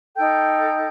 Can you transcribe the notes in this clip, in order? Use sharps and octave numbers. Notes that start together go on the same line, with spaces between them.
D#4 A4 G5 G6